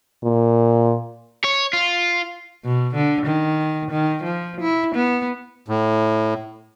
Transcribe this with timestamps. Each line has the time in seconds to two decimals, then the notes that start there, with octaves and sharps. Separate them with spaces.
0.24 A#2
1.44 C#5
1.73 F4
2.64 B2
2.95 D3
3.26 D#3
3.91 D#3
4.23 F3
4.60 E4
4.95 B3
5.68 A2